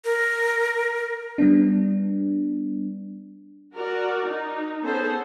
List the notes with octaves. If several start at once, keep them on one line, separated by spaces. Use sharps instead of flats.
A#4
G3 B3 D4
F#4 A#4 D5
D#4
B3 C#4 G#4 A4 C5